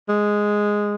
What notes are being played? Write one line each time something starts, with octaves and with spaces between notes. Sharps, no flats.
G#3